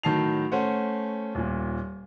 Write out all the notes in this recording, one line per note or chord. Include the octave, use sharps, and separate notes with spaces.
A2 D#3 F#3 A5 C7 F7
A3 C#4 C5 F#5
D#1 A#2